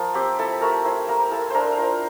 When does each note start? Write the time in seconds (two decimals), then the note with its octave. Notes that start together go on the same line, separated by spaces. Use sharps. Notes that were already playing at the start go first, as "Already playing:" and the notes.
Already playing: F3 A#3 F4
0.14 C4 G4
0.38 E4 A4
0.61 A3 A#4
0.85 E4 C5
1.08 A#3 A#4
1.31 E4 A4
1.50 D4 A#4 C5
1.71 A#4
1.78 F4 C5